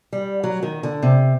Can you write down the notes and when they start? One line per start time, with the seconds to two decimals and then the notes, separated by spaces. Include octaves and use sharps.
0.13 G3
0.44 F#3
0.63 D#3
0.83 D3
1.03 C3